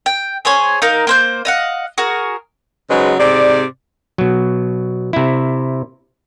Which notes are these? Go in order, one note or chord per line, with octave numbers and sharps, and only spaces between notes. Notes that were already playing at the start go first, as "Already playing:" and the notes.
G5
G#4 C5 C#5 G#5
D#4 A#4 F5
A#3 C5 G6
D#5 F5 F#5
F#4 G#4 A#4
C#3 F#3 G#3 D#4 B4 C5
G#2 C3 C4 D5
B2 F#3
C3 E4